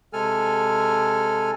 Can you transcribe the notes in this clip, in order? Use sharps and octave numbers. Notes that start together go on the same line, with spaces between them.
C3 G#3 A4 G#5 F6